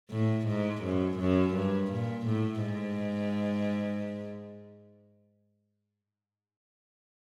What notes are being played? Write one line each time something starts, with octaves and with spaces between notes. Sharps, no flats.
A2
G#2
F#2
F#2
G2
A#2
A2
G#2